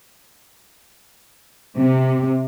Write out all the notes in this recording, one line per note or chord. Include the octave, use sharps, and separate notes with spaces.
C3